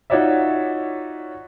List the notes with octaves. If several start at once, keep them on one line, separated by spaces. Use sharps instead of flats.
D#4 F4 F#4 C#5 D5 E5